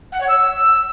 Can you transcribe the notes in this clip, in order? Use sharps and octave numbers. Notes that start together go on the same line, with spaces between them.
F#5
C#5
E6